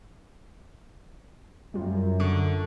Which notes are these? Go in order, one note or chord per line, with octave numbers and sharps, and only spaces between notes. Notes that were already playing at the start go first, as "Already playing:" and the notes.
F#2 G3 F4
D3 C#6